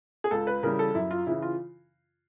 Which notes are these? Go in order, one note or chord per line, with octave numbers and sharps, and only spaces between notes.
G#4
C#2 A4
B4
C#3 E3 G3 A#4
A4
F#2 E4
F4
C#3 E3 E4
F4